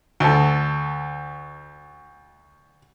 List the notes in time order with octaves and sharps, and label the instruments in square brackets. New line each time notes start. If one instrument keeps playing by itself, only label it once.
[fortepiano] D2 A4